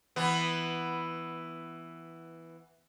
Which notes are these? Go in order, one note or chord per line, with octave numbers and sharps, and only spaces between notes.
E3 B3